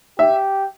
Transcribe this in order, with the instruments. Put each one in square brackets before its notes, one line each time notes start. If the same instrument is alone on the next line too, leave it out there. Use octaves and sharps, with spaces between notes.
[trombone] G4 [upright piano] E5